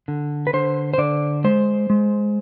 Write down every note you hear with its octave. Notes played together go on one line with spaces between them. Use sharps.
D3
B4
D3 C5
C5
D3 D5
G#3 C5
G#3